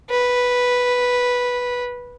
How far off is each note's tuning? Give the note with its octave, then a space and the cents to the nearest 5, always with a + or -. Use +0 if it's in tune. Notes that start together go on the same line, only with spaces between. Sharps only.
B4 -5